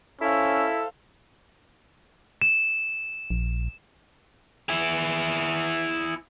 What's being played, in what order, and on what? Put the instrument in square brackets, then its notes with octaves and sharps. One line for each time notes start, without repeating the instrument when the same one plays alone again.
[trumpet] C#4 [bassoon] E4 [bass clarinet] A4 [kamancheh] C5 F5
[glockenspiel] E7
[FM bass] A#1
[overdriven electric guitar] E4 G#4